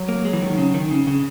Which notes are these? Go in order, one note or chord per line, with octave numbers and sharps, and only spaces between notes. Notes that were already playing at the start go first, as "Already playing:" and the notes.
Already playing: F#3
A#3
G#3
E3
D#3
C#3
D#3
C#3
C#3